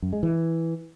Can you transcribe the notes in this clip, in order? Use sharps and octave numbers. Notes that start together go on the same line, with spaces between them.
F#2
G#3
E3